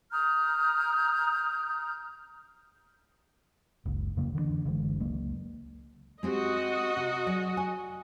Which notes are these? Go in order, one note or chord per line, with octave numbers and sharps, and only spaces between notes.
A#5 D#6 F6 G6
F#1 C#2
F2 C#3 F#3 A#3
D3 E3 G#3 D4
F#1 D3 E3 G#3
C#2 F#3 A#3
G#3 C4 F#4 G4 D#5
C3
F#3 G#4 D5
G#5